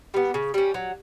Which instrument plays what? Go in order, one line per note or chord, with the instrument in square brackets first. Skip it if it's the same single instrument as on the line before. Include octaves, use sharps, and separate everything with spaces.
[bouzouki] G3 B3
C#3
G3 C#4
F#3